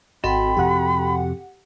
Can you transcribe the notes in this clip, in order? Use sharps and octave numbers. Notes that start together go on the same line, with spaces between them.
G#1 C4 F#4 A4 D#5 G5 B5
F2 C3 F#4 G4 F#5